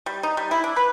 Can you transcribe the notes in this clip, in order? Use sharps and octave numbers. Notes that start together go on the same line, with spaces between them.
G3
D#4
G3
E4
D4
B4